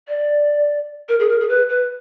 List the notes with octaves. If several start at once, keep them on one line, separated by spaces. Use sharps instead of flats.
D5
A#4
G#4
A#4
G#4
B4
B4